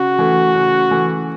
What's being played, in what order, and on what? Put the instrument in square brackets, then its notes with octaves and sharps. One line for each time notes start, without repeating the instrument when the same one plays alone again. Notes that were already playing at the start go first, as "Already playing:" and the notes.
Already playing: [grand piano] C#3 [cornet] F#4
[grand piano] E3 A3
C#3
E3 A3